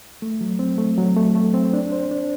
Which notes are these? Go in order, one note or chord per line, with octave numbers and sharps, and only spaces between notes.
A3
F#3
C4
A3
F#3
A3
A3
C4
D4
C5
D4